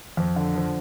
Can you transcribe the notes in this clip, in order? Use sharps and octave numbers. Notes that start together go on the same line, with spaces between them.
F2
D3
F3